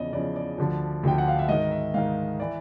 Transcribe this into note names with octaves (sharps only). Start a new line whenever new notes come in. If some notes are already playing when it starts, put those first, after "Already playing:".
Already playing: E2 C#3 F3 D5 D#5
E2 C#3 F3 D5
D5
D2 D3 F3
D2 D3 F3 G5
F#5
F5
E5
G#2 D#3 D#5
E5
G#2 D#3 F5
E3 D5